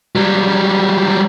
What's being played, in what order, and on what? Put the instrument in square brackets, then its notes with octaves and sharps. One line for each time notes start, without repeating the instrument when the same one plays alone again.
[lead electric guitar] F#3 G3